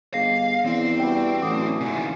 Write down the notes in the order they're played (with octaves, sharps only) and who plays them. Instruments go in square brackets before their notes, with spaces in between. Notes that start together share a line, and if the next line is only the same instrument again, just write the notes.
[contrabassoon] G1 [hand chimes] G#4 D#5 A#6 [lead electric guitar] F5
[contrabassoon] E2 [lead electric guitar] C4 [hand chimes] D5
[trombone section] G3 D4 F#4 [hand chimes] B4 E5 G5
[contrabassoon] A1 [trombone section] D3 E3 F#3 [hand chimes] D6 D#6
[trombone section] E2 A#2 [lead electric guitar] C#3 D#4 [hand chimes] G#5